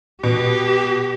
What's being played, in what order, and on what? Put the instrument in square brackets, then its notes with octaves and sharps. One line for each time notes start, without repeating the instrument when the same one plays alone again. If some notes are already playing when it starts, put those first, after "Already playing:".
[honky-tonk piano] B2 [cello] G4